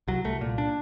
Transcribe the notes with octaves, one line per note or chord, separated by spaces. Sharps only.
C2 F#3
C2 A3
A#2
D4